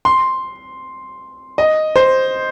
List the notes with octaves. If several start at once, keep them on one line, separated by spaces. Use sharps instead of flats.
C6
D#5
C5